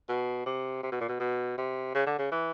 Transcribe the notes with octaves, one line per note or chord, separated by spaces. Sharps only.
B2
C3
C3
B2
A#2
B2
B2
C3
C#3
D3
C#3
E3